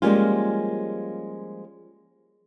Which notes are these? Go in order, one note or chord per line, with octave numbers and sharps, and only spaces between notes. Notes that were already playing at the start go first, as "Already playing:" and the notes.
F3 G3 G#3 A#3 C#4 F4